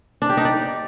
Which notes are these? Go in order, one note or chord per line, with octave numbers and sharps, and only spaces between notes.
D4
G4
D#4
D5